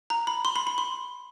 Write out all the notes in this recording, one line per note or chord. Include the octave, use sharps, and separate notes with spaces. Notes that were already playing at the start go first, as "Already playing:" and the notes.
A#5
B5
C6
B5
B5
C6